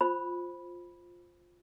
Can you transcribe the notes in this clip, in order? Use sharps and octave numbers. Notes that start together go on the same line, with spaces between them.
F4 C5 B5